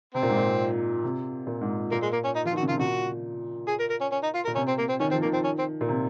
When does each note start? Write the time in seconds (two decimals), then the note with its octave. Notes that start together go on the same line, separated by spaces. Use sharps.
0.15 C3 C4
0.23 A#2
0.29 G#2
0.37 A#2
1.04 C3
1.47 A#2
1.61 G#2
1.92 A#2 A#3
2.03 G#3
2.13 A#3
2.24 C#4
2.36 D#4
2.45 F3 F4
2.53 D#3
2.57 F#4
2.62 C#3
2.69 C3 F4
2.79 A#2 F#4
3.68 G#4
3.80 A#4
3.90 A#4
4.01 C#4
4.12 C#4
4.23 D#4
4.35 F4
4.45 A#2 A#4
4.56 C3 C#4
4.68 C4
4.78 A#3
4.89 C4
5.00 D#3 C#4
5.11 F3 C4
5.22 D#3 A#3
5.33 C4
5.45 C#4
5.59 C4
5.81 A#2
5.89 C3